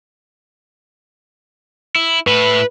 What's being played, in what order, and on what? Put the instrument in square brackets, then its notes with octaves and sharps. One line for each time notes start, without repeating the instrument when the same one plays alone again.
[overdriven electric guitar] E4
[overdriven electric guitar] A2 E4 [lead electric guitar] B4